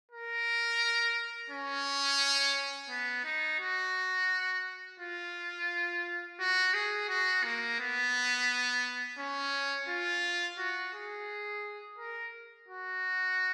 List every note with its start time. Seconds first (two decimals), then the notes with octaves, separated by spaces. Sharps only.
0.12 A#4
1.50 C#4
2.90 B3
3.25 D#4
3.60 F#4
5.00 F4
6.40 F#4
6.74 G#4
7.09 F#4
7.44 A#3
7.80 B3
9.19 C#4
9.89 F4
10.58 F#4
10.94 G#4
11.98 A#4
12.68 F#4